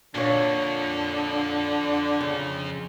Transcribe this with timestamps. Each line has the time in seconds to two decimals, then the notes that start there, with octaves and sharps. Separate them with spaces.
0.15 F2 A#2 D3 C#5
2.21 C#3